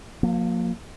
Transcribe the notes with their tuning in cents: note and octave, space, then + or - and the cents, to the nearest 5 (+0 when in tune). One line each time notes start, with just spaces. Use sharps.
F3 +40 A#3 +0